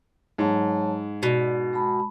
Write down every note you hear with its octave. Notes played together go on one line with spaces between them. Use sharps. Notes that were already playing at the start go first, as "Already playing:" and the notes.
G#2 F#3 C#5 A5
B2 D5
G#3 A5 B5